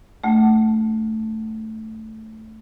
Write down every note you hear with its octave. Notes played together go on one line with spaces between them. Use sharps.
D2 A3